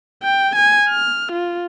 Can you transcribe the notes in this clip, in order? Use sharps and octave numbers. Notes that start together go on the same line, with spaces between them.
G5
G#5
F6
F4